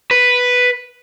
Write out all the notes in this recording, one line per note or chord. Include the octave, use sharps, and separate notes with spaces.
B4